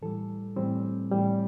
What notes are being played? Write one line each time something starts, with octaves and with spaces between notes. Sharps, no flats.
A2 E3 G3 A4
A2 E3 G3 C4
A2 E3 G3